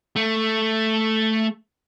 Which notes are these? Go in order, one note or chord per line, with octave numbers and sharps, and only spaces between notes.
A3